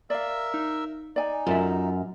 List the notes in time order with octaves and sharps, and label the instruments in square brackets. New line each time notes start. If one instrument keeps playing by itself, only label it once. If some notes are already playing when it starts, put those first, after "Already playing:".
[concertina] A#4 E5 E6 [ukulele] D5 F5
[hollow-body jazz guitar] D#4
[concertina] D#4 [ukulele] D5 G#5
[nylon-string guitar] F#2 [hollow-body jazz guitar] F4 A4 E5